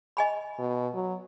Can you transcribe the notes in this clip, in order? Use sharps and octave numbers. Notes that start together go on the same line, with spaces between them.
D#5 G#5 B5
B2
F#3